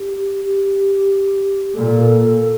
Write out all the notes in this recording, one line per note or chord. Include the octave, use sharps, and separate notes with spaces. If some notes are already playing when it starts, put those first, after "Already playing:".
Already playing: G4
G4
A#2 A4